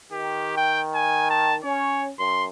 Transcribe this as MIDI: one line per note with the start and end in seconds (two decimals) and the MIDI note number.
0.12 1.60 51
0.12 0.53 67
0.57 0.81 79
0.95 1.27 80
1.30 1.55 81
1.64 2.11 61
1.64 2.07 73
2.19 2.50 42
2.19 2.46 84